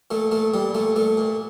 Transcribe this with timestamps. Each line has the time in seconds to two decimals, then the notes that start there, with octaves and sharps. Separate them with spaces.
0.11 A#2 A3
0.31 A#2 A3
0.54 A#2 G3
0.75 A#2 A3
0.96 A#2 A3
1.17 A#2